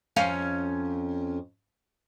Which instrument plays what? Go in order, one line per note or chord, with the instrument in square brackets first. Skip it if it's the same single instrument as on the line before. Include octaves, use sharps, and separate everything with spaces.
[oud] F2 C#4 F5